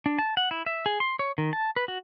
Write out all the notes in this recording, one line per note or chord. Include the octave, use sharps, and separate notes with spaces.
D4
A5
F#5
E4
E5
G#4
C6
C#5
D#3
A5
B4
F#4